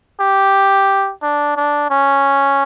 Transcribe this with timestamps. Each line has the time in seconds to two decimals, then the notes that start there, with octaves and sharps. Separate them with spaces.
0.20 G4
1.22 D4
1.56 D4
1.90 C#4